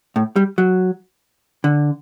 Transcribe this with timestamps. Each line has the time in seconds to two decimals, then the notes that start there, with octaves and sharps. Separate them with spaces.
0.16 A2
0.36 G3
0.58 F#3
1.64 D3